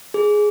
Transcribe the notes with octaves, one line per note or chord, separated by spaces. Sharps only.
G#4